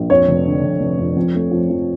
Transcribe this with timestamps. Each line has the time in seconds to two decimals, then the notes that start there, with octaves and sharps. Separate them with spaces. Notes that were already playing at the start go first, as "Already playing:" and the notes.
Already playing: A#1
0.10 F2 C#5
0.28 F1
0.46 D3
0.63 F1
0.81 F1
0.99 F2
1.16 F2
1.34 A3
1.51 F3
1.70 F3